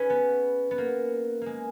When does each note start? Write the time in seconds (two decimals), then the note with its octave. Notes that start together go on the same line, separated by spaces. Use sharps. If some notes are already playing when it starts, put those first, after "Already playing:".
Already playing: C#4 G#4 B4
0.10 B3
0.71 B3
0.78 A#3
1.41 G#3 A#3